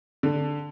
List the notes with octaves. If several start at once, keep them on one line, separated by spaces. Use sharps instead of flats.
D3